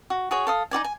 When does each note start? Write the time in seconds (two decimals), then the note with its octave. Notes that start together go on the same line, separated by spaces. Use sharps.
0.10 F#4
0.31 F#4 G#4 C#5
0.47 A4 F5 D#6
0.71 D#4 F#4 D5 G#5
0.85 G#5